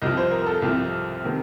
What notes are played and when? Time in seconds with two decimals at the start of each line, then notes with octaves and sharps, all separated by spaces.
0.02 C2 C3 F3 D#5
0.17 C5
0.31 A#4
0.42 A#4
0.46 A4
0.62 C2 C3 F3
1.24 C3 D#3